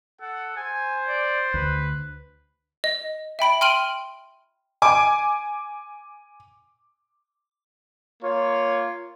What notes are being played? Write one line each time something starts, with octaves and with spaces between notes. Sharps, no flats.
A4 F#5
C5 G#5
D5
D2 B4
D#5
E5 G5 B5 D7
G5 C6 F6 D7 D#7 F#7
G#5 D6
A#3 F4 C#5